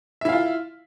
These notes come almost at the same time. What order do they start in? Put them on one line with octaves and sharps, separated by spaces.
E5 E4 F5 F4